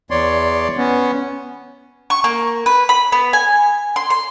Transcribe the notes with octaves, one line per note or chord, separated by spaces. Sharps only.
E2 C#5 D5 C6
B3 C#4
C#6
A#3
B4
B5
B3
G#5
C6
C6